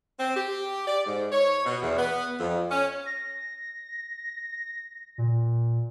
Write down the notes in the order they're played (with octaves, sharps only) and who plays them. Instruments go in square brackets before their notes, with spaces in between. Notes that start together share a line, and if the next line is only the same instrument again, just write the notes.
[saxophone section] C4
G4
D5
G#2
C#5
B2
E2
B3
F2
C#4
[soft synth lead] A#6
A#2